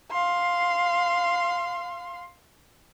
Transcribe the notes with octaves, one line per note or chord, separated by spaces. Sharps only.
F5 C6